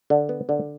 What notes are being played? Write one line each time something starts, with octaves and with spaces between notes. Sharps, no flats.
D3
B3
D3